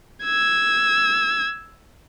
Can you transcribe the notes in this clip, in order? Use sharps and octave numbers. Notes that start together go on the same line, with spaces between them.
E6 G#6